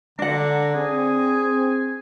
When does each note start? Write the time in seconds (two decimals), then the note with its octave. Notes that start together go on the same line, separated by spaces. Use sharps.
0.19 D3 D4 F#5 A#5
0.75 C4 G#4 G#5